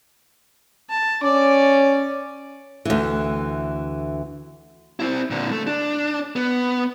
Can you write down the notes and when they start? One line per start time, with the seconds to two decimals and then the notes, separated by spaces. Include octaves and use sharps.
0.90 A5
1.23 C#4 D5 D6
2.85 D2 E3
5.00 C4 E4
5.30 A#2 D3
5.51 A3
5.67 D4
6.36 B3